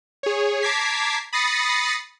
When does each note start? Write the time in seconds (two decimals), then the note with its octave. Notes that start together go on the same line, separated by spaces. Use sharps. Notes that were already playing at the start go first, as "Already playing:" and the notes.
0.23 G#4 C#5
0.62 A5 A#5 D6 G#6 B6 C7
1.33 B5 D#6 A6 A#6 C7 C#7